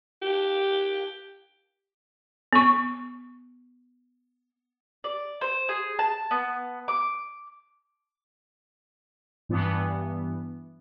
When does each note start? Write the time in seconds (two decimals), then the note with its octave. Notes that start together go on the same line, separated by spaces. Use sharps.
0.22 G4
2.53 B3 C#6
5.04 D5
5.41 C5
5.69 G#4
5.99 A5
6.31 B3
6.88 D6
9.49 G2 E3 B3